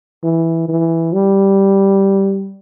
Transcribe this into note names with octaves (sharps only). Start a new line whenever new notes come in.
E3
E3
G3